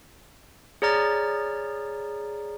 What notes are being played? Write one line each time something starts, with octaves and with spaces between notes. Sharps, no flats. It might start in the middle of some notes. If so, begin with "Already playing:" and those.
G#4 C#5 D5 A#5 F6 A6